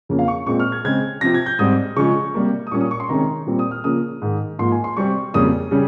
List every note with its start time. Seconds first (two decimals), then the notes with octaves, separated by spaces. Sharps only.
0.09 F2 C#3 F3 A#3 C#4
0.19 F5
0.28 C#6
0.47 A#2 G#3 C4 C#6
0.60 F6
0.72 G#6
0.84 C#3 G#3 C4 G#6
1.21 C3 F3 C4 A#6
1.34 G#6
1.46 G6
1.59 G#2 G3 C4 D#6
1.96 C#3 F3 G#3 C#4 C#6
2.34 C3 G3 A#3
2.67 D#6
2.72 A#2 G3 A#3 C#4 C#6
2.81 D#6
2.91 C#6
3.00 C6
3.09 C3 D#3 G#3 C#4 A#5
3.46 A#2 G3 C4
3.59 D#6
3.71 F6
3.84 C#3 F3 A#3 C#4 D#6
4.22 G#2 D#3 G#3
4.59 G#2 F3 A#3 C6
4.72 G#5
4.84 C6
4.97 C3 G3 C4 C#6
5.34 F2 C#3 G3 A#3 C#4 D#6
5.71 C#3 G3 C#4